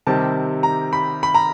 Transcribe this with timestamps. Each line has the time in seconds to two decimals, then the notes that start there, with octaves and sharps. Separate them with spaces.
0.07 C3 D#3 G3 C4 A5
0.63 A#5
0.93 B5
1.23 B5
1.34 A#5